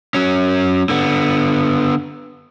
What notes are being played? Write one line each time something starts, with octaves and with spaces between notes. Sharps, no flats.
F#3 C#4
D3 B3